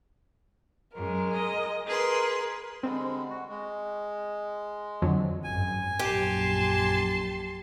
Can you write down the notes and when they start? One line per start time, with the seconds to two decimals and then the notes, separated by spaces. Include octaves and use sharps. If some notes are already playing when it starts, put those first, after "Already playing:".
0.96 F#2 G#3 A#4
1.34 D#5
1.87 G#4 A#4 B4 C6
2.83 D3 G3 G#3 C4
3.30 F#4
3.50 G#3
5.02 F2 D3 F#3
5.44 G#1 F#2 G#5
5.99 A#1 F#2 G4 A5 C6